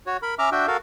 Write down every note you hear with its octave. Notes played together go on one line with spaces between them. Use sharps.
F#4 C#5
A#4 B5
C#4 E5 A#5 D6 F6
D4 F#4 E5 G5
F#4 A4 A#4 F5